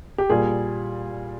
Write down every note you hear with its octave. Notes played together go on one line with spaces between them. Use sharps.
G4
A#2 G3 G#4